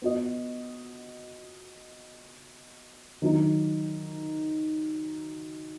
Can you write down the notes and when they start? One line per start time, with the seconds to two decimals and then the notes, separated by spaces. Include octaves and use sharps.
0.02 B3 F#4 D#5
3.22 D#3 F#3 D#4